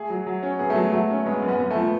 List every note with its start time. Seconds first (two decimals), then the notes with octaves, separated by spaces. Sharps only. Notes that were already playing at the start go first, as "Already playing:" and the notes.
Already playing: A3 G#4
0.10 F#3
0.26 F#3
0.43 C#4
0.59 B3 G#4
0.70 A3
0.75 F#3
0.92 F#3 A3
1.10 C#4
1.26 G#3 B3
1.42 F#2
1.48 B3
1.59 F#2 B3
1.71 F3 A3
1.81 B3